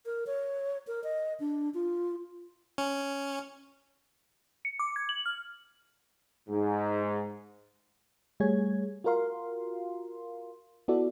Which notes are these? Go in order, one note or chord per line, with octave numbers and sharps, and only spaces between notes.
A#4
C#5
A#4
D#5
D4
F4
C#4
C#7
D6
G#6
F#7
F6
G#2
G3 A3 G#4 C#5 G#6
F4 F#4 A#4 F5 C6
B3 E4 F#4 A4 D5